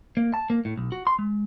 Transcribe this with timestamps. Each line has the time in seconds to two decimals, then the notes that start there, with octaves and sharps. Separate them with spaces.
0.17 A#3
0.34 A5
0.50 A#3
0.65 A2
0.77 B1
0.92 F#4
1.07 C6
1.19 G#3